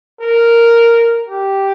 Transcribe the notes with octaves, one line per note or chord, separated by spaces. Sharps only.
A#4
G4